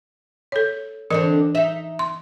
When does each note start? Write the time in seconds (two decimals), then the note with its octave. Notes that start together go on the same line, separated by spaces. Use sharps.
0.52 A4 C#5
1.10 D3 E3 C4 D4 A#4 D#5
1.55 D#4 E5
1.99 C6